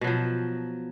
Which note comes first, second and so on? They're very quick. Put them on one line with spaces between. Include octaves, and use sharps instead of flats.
B2 F#3 F3